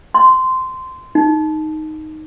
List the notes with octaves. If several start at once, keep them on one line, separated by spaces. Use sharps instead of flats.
C6
D#4